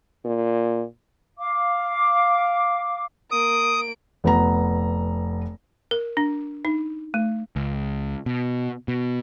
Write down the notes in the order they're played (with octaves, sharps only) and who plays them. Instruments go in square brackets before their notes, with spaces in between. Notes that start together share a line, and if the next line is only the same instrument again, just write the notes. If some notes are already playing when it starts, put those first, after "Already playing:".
[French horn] A#2
[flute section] F5 D6
[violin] A#3 D7 [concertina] D#6
[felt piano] F1 B3 A#5
[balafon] A#4
D4
D#4
A3
[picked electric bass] C#2
B2
B2